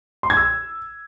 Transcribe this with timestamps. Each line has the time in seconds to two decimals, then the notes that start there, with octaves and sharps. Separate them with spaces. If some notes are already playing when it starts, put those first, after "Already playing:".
0.23 C6
0.30 G#6
0.37 E6